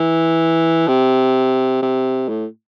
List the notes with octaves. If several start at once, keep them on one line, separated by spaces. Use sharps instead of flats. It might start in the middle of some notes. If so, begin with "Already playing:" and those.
Already playing: E3
C3
C3
A2